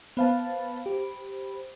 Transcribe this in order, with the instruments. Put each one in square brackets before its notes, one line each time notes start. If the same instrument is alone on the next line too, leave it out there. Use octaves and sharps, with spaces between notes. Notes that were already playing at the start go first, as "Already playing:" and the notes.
[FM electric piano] B3 F5 A5 [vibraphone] C5 B5
[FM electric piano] G4